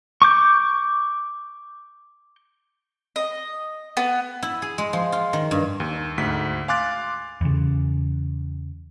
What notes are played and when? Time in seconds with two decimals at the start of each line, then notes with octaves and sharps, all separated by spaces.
0.22 C#6 D6 G6
3.16 D#5
3.97 B3
4.43 E4
4.62 G#4
4.78 G#3
4.93 F3
5.12 F4
5.33 D#3
5.51 G2
5.80 D#2
6.18 D2 G#2 B6
6.68 F5 G#5 C6 D6 F#6 A6
7.41 E2 C#3